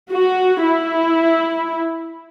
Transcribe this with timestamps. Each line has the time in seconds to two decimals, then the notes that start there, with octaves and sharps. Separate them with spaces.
0.11 F#4
0.63 E4